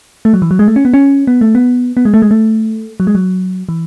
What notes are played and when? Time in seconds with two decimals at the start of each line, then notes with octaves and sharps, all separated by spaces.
0.25 A3
0.34 F#3
0.42 E3
0.51 F#3
0.59 G#3
0.68 A3
0.76 C#4
0.85 B3
0.94 C#4
1.27 B3
1.41 A3
1.55 B3
1.97 B3
2.05 G#3
2.14 A3
2.22 G#3
2.31 A3
3.00 F#3
3.07 G#3
3.15 F#3
3.69 E3